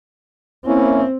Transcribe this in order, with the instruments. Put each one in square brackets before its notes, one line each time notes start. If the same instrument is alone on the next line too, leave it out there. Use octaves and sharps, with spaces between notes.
[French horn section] A#3 C#4 E4 [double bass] C4